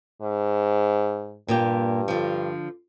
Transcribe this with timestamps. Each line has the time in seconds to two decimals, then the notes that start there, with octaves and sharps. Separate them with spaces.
0.22 G#2
1.48 G2 A#2 A#3 G4
2.08 D3 F3